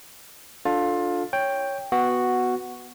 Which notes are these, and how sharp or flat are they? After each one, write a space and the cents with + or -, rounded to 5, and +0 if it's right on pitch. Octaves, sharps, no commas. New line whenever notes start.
D4 +0 F4 +20 A4 +0
C#5 +0 G5 +5
B3 +0 F#4 +0